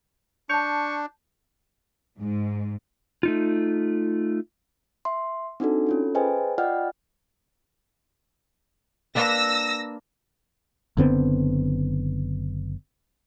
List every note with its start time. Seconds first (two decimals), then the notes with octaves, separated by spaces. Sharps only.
0.50 D4 A5 C#6 G6
2.19 G#2
3.23 A3 D#4 F4
5.05 E5 C6
5.60 C4 D4 D#4 F#4 A4
5.87 C#4 F4 A4
6.15 G#4 B4 C5 D#5 G5 G#5
6.58 F4 D5 D#5 F#5 G5 F6
9.15 A#3 D4 B4 E6 A#6
10.97 F#1 D3 B3 C4